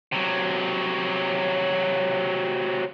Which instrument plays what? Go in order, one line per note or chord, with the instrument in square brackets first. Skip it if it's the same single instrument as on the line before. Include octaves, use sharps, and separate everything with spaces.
[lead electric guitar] C3 F#3